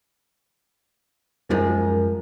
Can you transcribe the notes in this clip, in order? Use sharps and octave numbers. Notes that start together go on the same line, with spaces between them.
F#2 F3 G#3 A#4